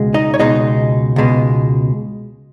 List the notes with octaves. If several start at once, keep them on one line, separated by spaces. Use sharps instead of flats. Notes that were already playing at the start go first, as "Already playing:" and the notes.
Already playing: C#2 B2 G#3
D#4 D#5
C#5
C#2 B2 G#3 D#4 D#5
C#2 B2 G#3